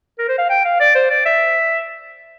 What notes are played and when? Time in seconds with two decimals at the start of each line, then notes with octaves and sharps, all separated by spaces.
0.19 A#4
0.28 C5
0.38 F5
0.49 G5
0.65 F5
0.80 D5
0.95 C5
1.10 D5
1.26 E5